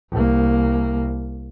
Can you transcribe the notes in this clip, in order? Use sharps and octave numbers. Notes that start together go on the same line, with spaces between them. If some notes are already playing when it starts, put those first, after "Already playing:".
C2 A#3